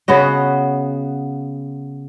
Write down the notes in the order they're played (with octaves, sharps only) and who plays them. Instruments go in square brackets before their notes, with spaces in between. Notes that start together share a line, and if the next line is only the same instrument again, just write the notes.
[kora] C#3 B3 F#4 D#5